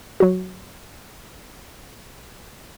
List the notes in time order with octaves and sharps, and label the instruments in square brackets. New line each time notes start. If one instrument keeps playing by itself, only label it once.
[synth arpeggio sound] F#3 F#4